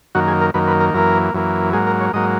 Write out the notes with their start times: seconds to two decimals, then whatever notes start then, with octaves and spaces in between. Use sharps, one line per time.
0.15 F#2 D#3 A#3 F#4
0.28 G#4
0.41 A#4
0.54 F#2 D#3 A#3 B4
0.68 B4
0.80 A#4
0.94 F#2 E3 A#3 A#4
1.34 F#2 E3 A#3
1.73 G#2 F#3 A#3 G#4
1.87 A#4
2.00 C#5
2.13 G#2 F#3 A#3 D#5